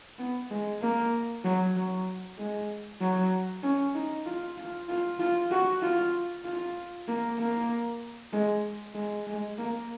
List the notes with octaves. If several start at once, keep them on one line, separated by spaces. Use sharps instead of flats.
B3
G#3
A#3
F#3
F#3
G#3
F#3
C#4
D#4
F4
F4
F4
F4
F#4
F4
F4
A#3
A#3
G#3
G#3
G#3
A#3